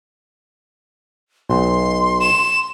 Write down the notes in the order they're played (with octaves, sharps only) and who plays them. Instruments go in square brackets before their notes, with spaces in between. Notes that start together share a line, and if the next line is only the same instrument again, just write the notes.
[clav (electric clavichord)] B1 [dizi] C6
[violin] E7